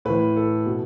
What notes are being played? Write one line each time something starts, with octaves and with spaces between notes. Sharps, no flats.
A2 E3 B4
A4
B2